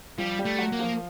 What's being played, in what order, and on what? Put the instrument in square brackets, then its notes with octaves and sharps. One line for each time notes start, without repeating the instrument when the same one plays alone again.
[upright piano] F3 F4 [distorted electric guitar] G3
[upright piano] G3 G4
[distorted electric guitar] A3
[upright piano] F#3 F#4
[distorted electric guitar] A#3
[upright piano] F3 F4